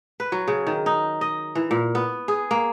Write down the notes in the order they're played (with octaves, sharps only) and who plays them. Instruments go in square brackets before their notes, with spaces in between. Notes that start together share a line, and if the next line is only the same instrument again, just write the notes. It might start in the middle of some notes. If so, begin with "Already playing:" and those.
[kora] B4
F#3
C#3
D#3
D#4
D#5
E3
A#2
B3
G#4
A#3